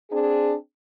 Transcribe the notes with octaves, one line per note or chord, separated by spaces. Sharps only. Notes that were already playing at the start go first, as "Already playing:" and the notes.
C4 D4 G#4